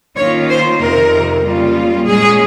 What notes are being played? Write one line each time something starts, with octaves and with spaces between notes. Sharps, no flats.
D#3 A#3 C#4 F4 C#5
C5
F2 C3 D#3 A#4
C#3 G3 A#3 F4
A#2 G#3 C#4 G#4